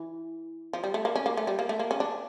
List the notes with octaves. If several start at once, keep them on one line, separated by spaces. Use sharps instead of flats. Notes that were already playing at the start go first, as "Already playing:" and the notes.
Already playing: E3
F3
G3
A3
A#3
C#4
A#3
A3
G3
A#3
A3
A#3
C#4
D4